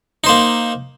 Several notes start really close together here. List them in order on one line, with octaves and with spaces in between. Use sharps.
D#4 C5 A#3